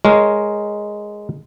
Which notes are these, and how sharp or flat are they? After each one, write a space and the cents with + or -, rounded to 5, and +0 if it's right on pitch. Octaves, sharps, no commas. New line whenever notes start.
G#3 +0 A#4 +0 C#5 +0